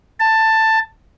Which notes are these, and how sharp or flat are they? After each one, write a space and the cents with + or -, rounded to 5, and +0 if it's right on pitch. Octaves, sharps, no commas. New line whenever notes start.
A5 +10